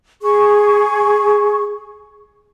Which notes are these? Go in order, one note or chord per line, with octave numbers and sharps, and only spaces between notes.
G#4 C#6